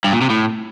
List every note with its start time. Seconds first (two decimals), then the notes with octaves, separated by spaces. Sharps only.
0.04 G2
0.13 A#2
0.21 C3
0.30 A2